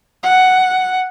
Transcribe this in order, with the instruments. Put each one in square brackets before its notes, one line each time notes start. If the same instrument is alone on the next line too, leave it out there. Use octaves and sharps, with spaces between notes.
[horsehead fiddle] F#5